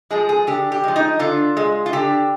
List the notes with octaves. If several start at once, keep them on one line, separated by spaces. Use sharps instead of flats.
F3 G#3 G#4
G#4
D3 G4
G4
F3 G#3
D#4
D3 F4
G#3
F4
D3 G4